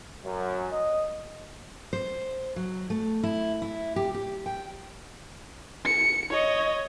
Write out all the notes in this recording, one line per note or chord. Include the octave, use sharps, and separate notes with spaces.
F#2
D#5
C5
F#3
A3
E4
E4
G4
G4
G5
C#7
C#5 D#5